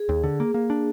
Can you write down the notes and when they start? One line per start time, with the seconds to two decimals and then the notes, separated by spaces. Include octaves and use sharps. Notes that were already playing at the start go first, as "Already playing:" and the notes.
Already playing: G#4
0.09 D#2
0.24 D3
0.40 A#3
0.54 A#3
0.70 D4